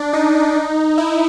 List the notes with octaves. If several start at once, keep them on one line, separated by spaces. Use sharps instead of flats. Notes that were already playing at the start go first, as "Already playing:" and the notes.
Already playing: D4
D#4
E4